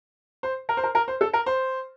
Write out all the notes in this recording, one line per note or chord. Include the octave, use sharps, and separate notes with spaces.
C5
A#4
C5
A#4
A#4
C5
A4
A#4
C5